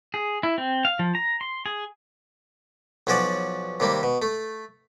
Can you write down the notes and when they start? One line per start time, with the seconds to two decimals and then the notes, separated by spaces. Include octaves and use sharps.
0.14 G#4
0.43 E4
0.58 C4
0.85 F5
0.99 F3
1.15 A#5
1.41 C6
1.66 G#4
3.07 B1 F3 C#4 F#4 D5
3.80 D#2 C3 G3 A#3
4.03 B2
4.22 A3